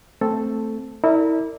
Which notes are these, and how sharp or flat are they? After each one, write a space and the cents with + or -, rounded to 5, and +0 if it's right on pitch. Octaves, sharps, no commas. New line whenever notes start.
A3 +10 C4 +0 A4 +0
E4 -30 A#4 -35 D5 -5